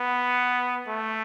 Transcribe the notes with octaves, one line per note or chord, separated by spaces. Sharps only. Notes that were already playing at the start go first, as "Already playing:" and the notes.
Already playing: B3
A3